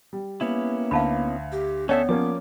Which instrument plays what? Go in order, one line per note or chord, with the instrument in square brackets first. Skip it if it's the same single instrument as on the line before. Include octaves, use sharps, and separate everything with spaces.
[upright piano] G3
[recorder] A#3 [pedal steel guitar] B3 C#4 E4
[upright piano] D2 [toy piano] F5 A5 B5
[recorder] G4
[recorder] B3 [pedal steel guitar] C#4 A4 E5 [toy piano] C#5 D5 G5
[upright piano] F3 A#3 C#4 [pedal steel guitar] D6